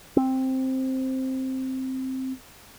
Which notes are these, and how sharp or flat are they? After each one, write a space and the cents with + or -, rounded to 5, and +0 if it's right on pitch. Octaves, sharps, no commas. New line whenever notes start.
C4 +5